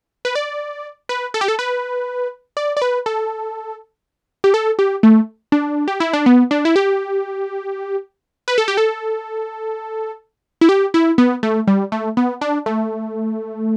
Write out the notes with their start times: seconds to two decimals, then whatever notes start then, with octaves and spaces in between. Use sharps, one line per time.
0.25 B4
0.35 D5
1.09 B4
1.34 A4
1.41 G4
1.48 A4
1.59 B4
2.57 D5
2.77 D5
2.82 B4
3.06 A4
4.44 G4
4.54 A4
4.79 G4
5.03 A3
5.52 D4
5.88 G4
6.00 E4
6.13 D4
6.26 B3
6.51 D4
6.65 E4
6.76 G4
8.48 B4
8.58 A4
8.68 G4
8.77 A4
10.61 E4
10.69 G4
10.94 E4
11.18 B3
11.43 A3
11.67 G3
11.92 A3
12.17 B3
12.41 D4
12.66 A3